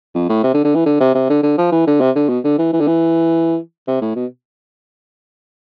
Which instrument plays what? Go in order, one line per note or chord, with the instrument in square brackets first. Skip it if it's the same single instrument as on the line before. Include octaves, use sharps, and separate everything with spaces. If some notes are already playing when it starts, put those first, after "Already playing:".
[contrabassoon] F2
A2
C3
D3
D3
E3
D3
C3
C3
D3
D3
F3
E3
D3
C3
D3
B2
D3
E3
E3
D3
E3
C3
A2
B2